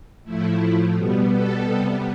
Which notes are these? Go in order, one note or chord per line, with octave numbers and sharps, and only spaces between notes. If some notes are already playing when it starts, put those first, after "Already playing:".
A2 F3 A3 E4
B2 G3 B3
A4
C3 G3 B3